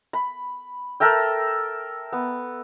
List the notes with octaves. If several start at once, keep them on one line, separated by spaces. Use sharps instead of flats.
B5
A4 A#4 E5 G5
B3